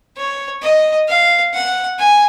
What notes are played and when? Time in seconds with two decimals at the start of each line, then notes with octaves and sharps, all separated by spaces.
0.17 C#5
0.63 D#5
1.08 F5
1.54 F#5
1.99 G#5